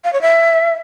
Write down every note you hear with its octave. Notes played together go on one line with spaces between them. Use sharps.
F5
C#5
E5